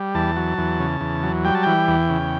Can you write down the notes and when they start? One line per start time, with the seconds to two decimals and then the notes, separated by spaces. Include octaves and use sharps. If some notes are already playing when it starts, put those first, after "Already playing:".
Already playing: G3
0.15 E2 A5
0.36 F#3
0.58 E2
0.80 C#3
1.01 E2
1.23 F#3
1.45 G3 G5
1.55 A5
1.63 E3 G5
1.88 E2
2.10 C#3